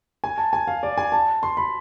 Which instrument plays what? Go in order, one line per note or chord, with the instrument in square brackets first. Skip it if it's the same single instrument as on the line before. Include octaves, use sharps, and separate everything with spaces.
[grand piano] G#5
A5
G#5
F5
D5
G#5
A5
C6
B5